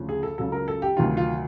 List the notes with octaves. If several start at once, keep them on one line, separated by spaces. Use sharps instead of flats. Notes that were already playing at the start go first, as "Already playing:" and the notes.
Already playing: D2 C#3 F3
G#4
A4
C#2 C#3 F#3 A4
A#4
A4
G4
D2 C3 D#3 F#3 F4
F4